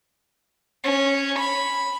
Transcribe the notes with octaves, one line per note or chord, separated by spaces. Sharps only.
C#4
B5